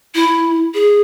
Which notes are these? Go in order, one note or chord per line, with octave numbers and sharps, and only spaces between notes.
E4
G#4